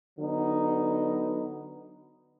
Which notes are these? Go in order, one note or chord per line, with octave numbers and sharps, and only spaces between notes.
D3 F#3 B3 D#4